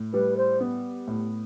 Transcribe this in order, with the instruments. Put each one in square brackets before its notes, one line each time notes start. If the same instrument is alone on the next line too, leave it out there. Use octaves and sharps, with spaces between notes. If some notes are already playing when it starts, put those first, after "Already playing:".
Already playing: [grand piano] A2
[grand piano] G3 [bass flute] B4
[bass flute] C5
[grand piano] B3
A2